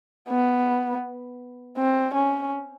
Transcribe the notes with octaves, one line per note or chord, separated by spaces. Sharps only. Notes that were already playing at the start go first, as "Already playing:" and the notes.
B3
C4
C#4